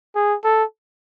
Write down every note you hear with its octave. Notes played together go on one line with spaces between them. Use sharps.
G#4
A4